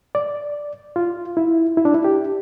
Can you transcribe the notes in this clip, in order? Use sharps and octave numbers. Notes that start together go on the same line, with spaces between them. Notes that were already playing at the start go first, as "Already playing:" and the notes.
D5
F4
E4
E4
D4
E4
G4